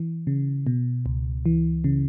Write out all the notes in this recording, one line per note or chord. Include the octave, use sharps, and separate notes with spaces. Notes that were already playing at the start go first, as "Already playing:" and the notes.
Already playing: E3
C#3
B2
C#2
E3
C#3